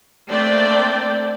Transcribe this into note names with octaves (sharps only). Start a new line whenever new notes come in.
A3 A#3 C4 D4 D5 G5